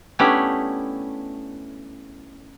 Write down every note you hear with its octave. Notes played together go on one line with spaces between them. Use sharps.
A3 B3 C#4 D4 E4 G4